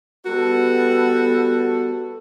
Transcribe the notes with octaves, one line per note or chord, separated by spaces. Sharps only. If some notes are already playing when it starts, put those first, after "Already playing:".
G3 B3 F#4 A4